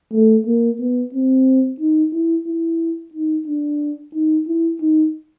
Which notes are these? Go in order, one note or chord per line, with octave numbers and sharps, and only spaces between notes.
A3
A#3
B3
C4
D#4
E4
E4
D#4
D4
D#4
E4
D#4